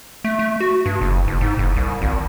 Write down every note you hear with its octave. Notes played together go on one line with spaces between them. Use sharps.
A3
A3
F#4
G2
F#1
F#1
G#2
F#1
C2
G#1